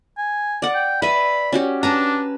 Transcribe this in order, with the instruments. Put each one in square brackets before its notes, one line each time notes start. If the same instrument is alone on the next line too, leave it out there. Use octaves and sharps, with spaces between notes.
[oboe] G#5
[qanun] D5 F#5
[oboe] G5
[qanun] B4 E5 G#5 [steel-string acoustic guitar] D5 [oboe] B5
[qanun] C#4 F#4 G4
[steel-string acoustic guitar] C#4 B4 A5 [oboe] D4 [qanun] A#5